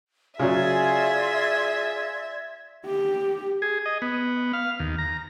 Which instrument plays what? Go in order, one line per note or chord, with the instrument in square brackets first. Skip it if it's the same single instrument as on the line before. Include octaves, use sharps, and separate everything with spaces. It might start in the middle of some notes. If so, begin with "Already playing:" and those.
[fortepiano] C#3 F#3 [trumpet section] F4 G#4 [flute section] D5 C6 G#6 [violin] E5
[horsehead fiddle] G4
[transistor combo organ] G#4
D#5
B3
F5
D#2
A#5